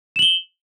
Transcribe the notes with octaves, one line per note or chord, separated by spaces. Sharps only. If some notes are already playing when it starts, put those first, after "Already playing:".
E7 F#7 G7